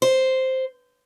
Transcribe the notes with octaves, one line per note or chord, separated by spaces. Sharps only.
C5